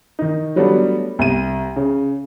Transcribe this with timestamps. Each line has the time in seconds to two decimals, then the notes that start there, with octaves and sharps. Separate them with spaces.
0.19 D#3 D#4
0.56 F#3 G3 A3 B3 D4
1.19 C2 D#7
1.76 C#3